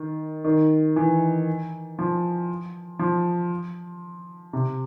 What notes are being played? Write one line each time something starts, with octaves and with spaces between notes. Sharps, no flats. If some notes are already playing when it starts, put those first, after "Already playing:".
Already playing: D#3
D#3
E3
F3
F3
C3